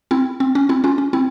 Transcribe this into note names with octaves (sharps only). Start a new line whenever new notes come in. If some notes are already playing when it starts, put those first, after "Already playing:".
C4 E4
C4
C#4
C4 E4
C#4 F4
C#4
C4 E4